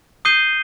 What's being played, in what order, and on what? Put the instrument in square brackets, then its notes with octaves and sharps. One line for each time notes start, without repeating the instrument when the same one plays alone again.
[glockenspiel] D#6 G6 C7 D#7 G7